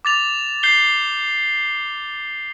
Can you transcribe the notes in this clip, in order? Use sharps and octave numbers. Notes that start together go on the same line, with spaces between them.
D6 A6 F7
G6 C7 G7